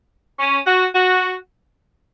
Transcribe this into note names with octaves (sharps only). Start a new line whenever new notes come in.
C#4
F#4
F#4